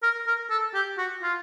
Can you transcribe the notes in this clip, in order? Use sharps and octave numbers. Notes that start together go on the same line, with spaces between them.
A#4
A#4
A4
G4
F#4
F4